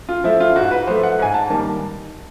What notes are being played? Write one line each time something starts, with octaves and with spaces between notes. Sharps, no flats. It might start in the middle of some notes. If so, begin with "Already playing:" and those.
F4
F3 A3 E4
F4
G#2 F#4
B4
F3 A3 C5
F#5
G#2 G#5
A5
D#3 G3 A#3 A5